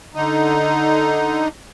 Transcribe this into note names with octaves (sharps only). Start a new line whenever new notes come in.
D3 D#4